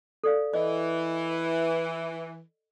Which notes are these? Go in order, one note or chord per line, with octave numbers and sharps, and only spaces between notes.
A4 D5 F5
E3 D#5